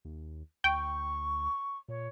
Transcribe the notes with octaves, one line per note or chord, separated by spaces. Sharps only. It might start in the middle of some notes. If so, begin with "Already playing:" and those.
D#2
D2 G5 C#6
A#2 C#5